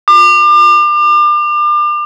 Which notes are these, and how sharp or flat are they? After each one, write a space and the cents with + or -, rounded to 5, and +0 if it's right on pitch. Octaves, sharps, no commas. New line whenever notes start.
D6 +35